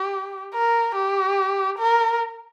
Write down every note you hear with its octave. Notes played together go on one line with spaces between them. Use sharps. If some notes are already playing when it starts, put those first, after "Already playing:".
Already playing: G4
A#4
G4
A#4